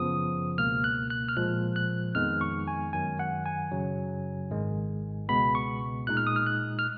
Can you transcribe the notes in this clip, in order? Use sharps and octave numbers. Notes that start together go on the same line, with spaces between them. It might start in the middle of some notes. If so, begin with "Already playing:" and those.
Already playing: F#2 C#3 F3 B3 D#6
C#2 B2 A#3 F6
F#6
F#6
F6
A#2 F3 G#3 F#6
F#6
F2 D#3 G#3 B3 D#4 F6
C#6
G#5
F#2 D#3 F#3 G#5
F#5
G#5
F#2 C#3 F#3
G#1 G#2 D#3 G#3
C#2 B2 G#3 B3 B5
C#6
A#2 G#3 D#4 F#6
F6
D#6
F6
F#6
F6